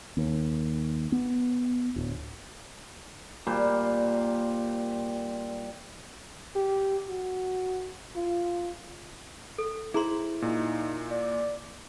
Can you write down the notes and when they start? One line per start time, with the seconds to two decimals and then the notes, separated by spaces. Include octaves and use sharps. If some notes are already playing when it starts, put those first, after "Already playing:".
0.17 D#2
1.12 B3
1.96 D1
3.47 A#2 G3 C5
6.56 G4
7.09 F#4
8.16 F4
9.58 A4
9.94 E4 G#4 C5 A#5 C6
10.42 A#2 D#4
11.11 D5